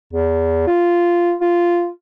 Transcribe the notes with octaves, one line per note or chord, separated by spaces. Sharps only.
E2
F4
F4